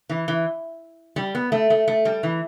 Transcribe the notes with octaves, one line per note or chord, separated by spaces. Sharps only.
E3
E3
G3
B3
A3
A3
A3
G3
E3